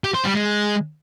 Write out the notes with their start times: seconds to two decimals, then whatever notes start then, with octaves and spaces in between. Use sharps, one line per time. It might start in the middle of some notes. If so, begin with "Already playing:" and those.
0.04 G4
0.14 C5
0.25 G3
0.35 G#3